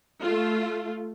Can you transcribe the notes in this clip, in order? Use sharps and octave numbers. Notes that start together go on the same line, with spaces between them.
A3 F4